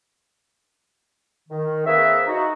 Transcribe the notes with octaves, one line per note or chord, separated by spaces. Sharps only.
D#3
A#3 C4 G#4 A#4 B4 E5
D#4 F#4